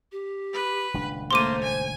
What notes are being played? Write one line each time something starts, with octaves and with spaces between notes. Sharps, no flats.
G4
B4
D#1 C#2 D4
A3 A#3 C5 C6 D6 D#7
G#5